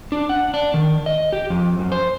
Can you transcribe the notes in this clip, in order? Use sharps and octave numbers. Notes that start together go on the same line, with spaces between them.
D4
F#5
D4
D#3
D#5
G4
F2
F#2
C5